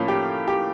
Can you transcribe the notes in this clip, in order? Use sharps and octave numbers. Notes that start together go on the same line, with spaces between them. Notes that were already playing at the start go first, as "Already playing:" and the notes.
Already playing: A2 F3 A#3 C#4
G4
G4